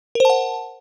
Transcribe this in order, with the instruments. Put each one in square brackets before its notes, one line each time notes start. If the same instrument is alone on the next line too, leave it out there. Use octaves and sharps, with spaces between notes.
[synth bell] A#4
C5
A5
F#5